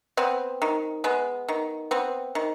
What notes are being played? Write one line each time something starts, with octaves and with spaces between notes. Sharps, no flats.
B3 C4
D#3
G#3 B3
D#3
B3 C4
D#3